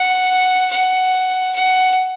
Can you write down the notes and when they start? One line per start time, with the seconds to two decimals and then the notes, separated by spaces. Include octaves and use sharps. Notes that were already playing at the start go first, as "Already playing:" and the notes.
Already playing: F#5
0.71 F#5
1.56 F#5